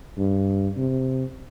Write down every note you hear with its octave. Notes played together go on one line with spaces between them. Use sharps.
G2
C3